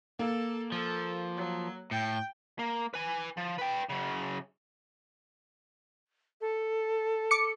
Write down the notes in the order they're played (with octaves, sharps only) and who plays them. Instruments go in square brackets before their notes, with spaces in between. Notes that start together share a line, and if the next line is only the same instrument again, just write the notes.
[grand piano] A#3 [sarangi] A4
[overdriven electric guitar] F3 [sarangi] A4
[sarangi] F#3
[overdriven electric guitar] A2 [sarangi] G5
[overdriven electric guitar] A#3
B4 G#5
F3
B4 G5
F#2 C#3
[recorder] A4
[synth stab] D6 C#7